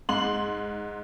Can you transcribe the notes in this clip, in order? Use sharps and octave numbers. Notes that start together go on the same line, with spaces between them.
G#2 C6 F#7